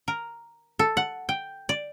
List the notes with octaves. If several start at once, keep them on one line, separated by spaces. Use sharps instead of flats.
A#4
A4
F#5
G5
D5